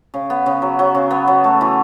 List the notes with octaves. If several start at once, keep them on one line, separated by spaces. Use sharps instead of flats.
C#3
B3
C#3
F#3
F#3
C#3
B3
F#3
A3
E3